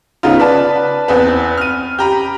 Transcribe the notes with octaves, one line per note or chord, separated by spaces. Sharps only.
C#3 B3 D#4 F4
B4 D5 A5
E2 C4 B4
F6 D#7
G4 A#5 B5